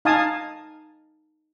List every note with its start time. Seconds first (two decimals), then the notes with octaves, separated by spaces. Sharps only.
0.05 D#4 F5 G#5 A5 D#6